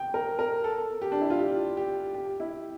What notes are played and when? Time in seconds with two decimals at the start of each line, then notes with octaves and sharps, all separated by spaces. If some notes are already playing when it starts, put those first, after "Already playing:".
Already playing: G5
0.14 A#4
0.39 A#4
0.64 A4
1.02 G4
1.12 D4
1.21 E4
1.30 F4
1.39 G4
1.77 G4
2.14 G4
2.40 E4